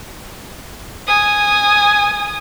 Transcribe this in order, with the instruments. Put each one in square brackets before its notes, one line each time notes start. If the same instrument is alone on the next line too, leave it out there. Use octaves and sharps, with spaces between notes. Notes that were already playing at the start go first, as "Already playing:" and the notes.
[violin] G#5 D#6